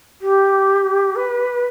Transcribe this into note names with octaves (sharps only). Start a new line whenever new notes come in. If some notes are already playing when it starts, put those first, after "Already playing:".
G4
B4